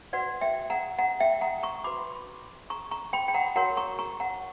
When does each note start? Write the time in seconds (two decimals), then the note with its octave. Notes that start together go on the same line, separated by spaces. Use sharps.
0.13 F#4 B4 D5 F#5
0.41 E5 G5
0.70 F#5 A#5
0.99 F#5 A#5
1.20 E5 G5
1.41 F#5 A#5
1.63 A#5 C#6
1.84 F#4 B4 B5 D6
2.70 A#5 C#6
2.91 A#5 C#6
3.13 G5 B5
3.28 G5
3.34 F#5 A#5
3.56 F#4 A#4 C#5 F#5 A#5
3.77 A#5 C#6
3.99 A#5 C#6
4.20 F#5 A#5